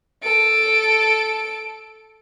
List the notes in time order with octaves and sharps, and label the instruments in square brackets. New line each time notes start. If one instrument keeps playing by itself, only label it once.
[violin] A4 D7